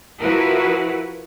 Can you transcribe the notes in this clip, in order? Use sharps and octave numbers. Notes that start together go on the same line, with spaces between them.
F3 E4 F#4 A#4 B4